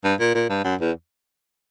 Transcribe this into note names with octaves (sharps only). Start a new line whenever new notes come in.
G2
A#2
A#2
G2
F#2
E2